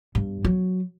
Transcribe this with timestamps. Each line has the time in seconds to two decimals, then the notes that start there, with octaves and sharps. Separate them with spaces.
0.15 G2
0.45 F#3